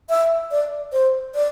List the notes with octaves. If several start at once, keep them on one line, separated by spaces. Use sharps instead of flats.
E5
D5
C5
D5